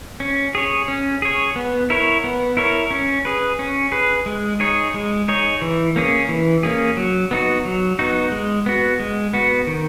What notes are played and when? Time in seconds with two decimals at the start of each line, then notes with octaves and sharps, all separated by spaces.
0.20 C#4
0.55 G#4 C#5
0.88 C#4
1.22 G#4 C#5
1.56 B3
1.90 E4 A#4 C#5
2.24 B3
2.57 E4 A#4 C#5
2.91 C#4
3.25 G#4 B4
3.59 C#4
3.92 G#4 B4
4.26 G#3
4.60 D#4 G#4 C#5
4.94 G#3
5.28 D#4 G#4 C#5
5.62 E3
5.96 A#3 C#4 G#4
6.29 E3
6.63 A#3 C#4 G#4
6.97 F#3
7.31 B3 D#4 F#4
7.65 F#3
7.99 B3 D#4 F#4
8.32 G#3
8.66 B3 F#4
9.00 G#3
9.33 B3 F#4
9.67 D#3